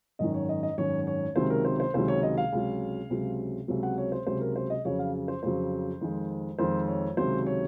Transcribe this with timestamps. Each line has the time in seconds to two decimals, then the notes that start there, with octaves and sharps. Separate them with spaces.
0.19 G#1 F#2 D#3 D#5
0.34 C#5
0.49 D#5
0.63 D#5
0.78 G#1 F#2 D#3 C#5
1.07 C#5
1.36 C#2 C3 D#3 F#3 C5
1.50 A#4
1.65 C5
1.80 C5
1.94 C#2 C3 D#3 F#3 C5
2.08 C#5
2.23 D#5
2.37 F5
2.52 C#2 C3 F#3
3.10 C#2 C3 F#3
3.68 C#2 C3 F#3
3.83 F#5
3.98 C#5
4.12 C5
4.27 C#2 C3 F#3 C5
4.41 A#4
4.56 C5
4.70 D#5
4.85 F2 C#3 F#3 C#5
4.99 F5
5.28 C5
5.43 F2 C#3 F#3 C5
6.01 F2 D#3 G#3
6.58 F2 D#3 G#3 C5
6.88 C#5
7.17 C#2 C3 D#3 F#3 C5
7.46 C#5